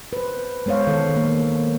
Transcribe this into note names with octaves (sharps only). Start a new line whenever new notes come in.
B4 C5
G#3 B3 C5 C#5 F5
D#3 A4
F#3 A#3